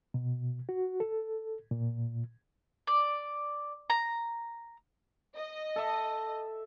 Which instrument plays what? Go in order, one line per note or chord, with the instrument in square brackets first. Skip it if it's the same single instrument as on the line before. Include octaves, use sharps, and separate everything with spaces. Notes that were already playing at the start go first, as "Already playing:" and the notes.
[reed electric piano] B2
F#4
A4
A#2
[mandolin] D5
A#5
[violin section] D#5
[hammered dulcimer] A4 E5